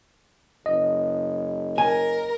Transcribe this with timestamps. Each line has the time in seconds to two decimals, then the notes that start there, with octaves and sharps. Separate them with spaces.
0.66 F#1 D#5
1.78 A#4 G#5